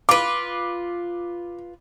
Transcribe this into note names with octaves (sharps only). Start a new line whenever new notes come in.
F4 B4 D6